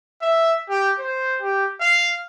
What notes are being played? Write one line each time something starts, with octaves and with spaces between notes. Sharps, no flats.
E5
G4
C5
G4
F5